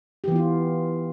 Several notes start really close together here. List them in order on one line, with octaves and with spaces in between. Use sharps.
G4 E3 B3 F4